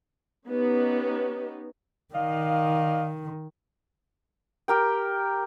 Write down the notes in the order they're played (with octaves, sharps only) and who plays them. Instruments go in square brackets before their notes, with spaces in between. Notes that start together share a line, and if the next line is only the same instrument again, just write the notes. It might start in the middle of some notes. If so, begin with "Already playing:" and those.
[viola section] B3 C#4 D#4 G4
[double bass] D#3 [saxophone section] D5 D#5 F5
[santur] G4 A#4 G5